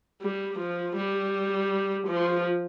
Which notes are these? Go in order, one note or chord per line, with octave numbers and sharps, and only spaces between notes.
G3
F3
G3
F3